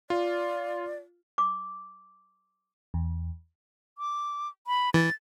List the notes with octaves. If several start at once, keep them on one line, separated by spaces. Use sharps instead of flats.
F4 D5
D6
E2
D6
B5
E3 A6